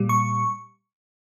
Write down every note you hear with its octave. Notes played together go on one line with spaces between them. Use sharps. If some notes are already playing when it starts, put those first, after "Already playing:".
Already playing: A#2 G3
C#6